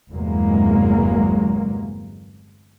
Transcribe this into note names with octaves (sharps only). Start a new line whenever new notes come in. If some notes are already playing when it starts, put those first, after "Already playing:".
G1 E2 C3 F#3 G#3 A#3